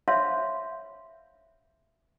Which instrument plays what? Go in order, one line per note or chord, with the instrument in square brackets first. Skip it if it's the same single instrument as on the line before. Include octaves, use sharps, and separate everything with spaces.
[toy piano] C5 C#5 E5 F5 B5 C6